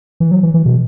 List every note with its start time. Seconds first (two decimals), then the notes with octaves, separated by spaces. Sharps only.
0.20 E3
0.31 F#3
0.43 E3
0.54 E3
0.65 B2